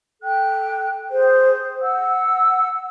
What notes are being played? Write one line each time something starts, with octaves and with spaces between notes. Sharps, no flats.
A4 G5 F#6
G#4 C5
F#5 E6